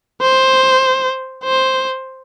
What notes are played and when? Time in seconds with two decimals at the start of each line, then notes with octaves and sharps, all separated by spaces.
0.22 C5
1.44 C5